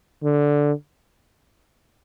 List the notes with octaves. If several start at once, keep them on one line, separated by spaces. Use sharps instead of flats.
D3